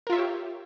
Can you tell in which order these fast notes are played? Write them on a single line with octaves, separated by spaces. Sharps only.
A#4 F4 E5 C#5 G4